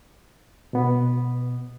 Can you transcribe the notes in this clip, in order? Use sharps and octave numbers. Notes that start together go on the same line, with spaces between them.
B2 B3